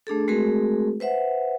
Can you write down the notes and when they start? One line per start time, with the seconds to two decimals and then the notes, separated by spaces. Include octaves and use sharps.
0.07 A3 D4 G#4 A4
0.28 G#3 A3 C4 F#4 G#4 A#4
1.00 B4 C5 E5 F#5